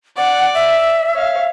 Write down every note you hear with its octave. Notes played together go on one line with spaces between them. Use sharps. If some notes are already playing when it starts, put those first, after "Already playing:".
D5 F#5
E5
C#5 F5